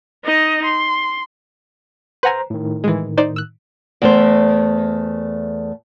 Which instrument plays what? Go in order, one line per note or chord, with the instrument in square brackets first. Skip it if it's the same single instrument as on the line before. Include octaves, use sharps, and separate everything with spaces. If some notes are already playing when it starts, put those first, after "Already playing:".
[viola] D#4 D#5
C6
[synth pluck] B4 F#5 G#5 [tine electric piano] C5 A#5
[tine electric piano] A2 D#3
[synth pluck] E3 G#3
D#4 C5 D5
E6 F#6
[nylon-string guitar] E2 A3 C5